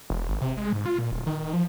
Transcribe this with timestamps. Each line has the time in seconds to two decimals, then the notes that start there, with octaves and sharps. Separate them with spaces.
0.10 E1
0.29 G#1
0.41 C3
0.57 G#3
0.73 G#2
0.86 F4
0.99 A#2
1.12 D1
1.27 D#3
1.53 F3